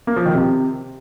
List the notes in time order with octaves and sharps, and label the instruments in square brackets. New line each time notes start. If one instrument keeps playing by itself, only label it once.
[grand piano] A#3
F3
D#3
C3